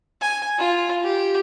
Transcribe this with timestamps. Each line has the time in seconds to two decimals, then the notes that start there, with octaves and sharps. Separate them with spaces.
0.21 G#5
0.59 F4
1.04 G4